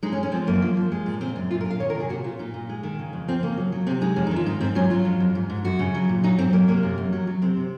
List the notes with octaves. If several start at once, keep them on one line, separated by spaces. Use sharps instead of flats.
G#3 D#4
C#4
G#3
C#4
F3 C4
F#2 A#3
F3
F3
G#3
A#2
C#3 C4
F#2
A#2 F4
A#4
A#2
F5
D#3 C#5
A#4
C3
G#4
A#2 F#4
A#2 F4
A#2 D#4
A#2
G#3
D#3
C#3
F2
F3 C4
C#3 A#3
F#3
F#3
C3 C4
G#3 D#4
F2 C#4
D#4
D#3
F4
G#2 D#4
G#2 C4
F#3 C#4
F#3 F4
F2
F2
G#2
G#2
F#2 F#4
C#3
F#3
A#2
F#3 D#4
G#2 C4
F#3 A#3
C3 A#3
F#2
F#2
F#3
F#3
C3 C4
C3